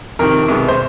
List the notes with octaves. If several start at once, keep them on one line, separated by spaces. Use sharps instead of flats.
F2 C3 D#3 A#4
C2 B2 G#3 B3
C5